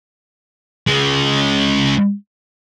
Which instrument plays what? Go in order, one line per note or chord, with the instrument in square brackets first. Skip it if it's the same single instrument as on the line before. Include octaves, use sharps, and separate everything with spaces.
[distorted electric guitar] C#3 G#3